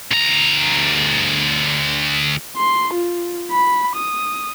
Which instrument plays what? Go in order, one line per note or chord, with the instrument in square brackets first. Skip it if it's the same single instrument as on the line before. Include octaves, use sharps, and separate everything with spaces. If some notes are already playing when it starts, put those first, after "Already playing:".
[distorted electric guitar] D2 A#5
[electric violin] C6
F4
B5
D#6